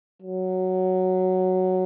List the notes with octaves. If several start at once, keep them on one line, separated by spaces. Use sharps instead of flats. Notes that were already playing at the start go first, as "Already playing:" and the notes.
F#3